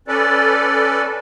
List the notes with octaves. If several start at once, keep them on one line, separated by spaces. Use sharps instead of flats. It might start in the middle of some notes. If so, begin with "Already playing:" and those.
C#4 A4 B4 D5